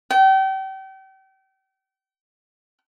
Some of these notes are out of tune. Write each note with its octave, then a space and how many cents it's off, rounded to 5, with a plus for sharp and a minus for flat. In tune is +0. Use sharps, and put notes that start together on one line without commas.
G5 -35